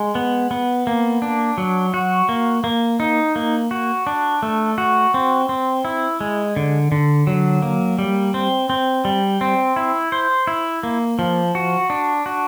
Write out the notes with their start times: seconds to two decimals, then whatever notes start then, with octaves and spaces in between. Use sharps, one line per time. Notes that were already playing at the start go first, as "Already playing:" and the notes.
Already playing: G#3
0.15 B3
0.51 B3
0.87 A#3
1.22 D4
1.58 F#3
1.94 F#4
2.29 A#3
2.64 A#3
3.00 D#4
3.36 A#3
3.71 F#4
4.07 D4
4.43 A3
4.78 F#4
5.14 C4
5.49 C4
5.85 E4
6.21 G#3
6.56 D3
6.92 D3
7.27 F#3
7.62 A#3
7.99 G3
8.34 C4
8.70 C4
9.05 G3
9.41 C4
9.76 E4
10.12 C5
10.47 E4
10.83 A#3
11.19 F3
11.55 F#4
11.90 D4
12.26 F#4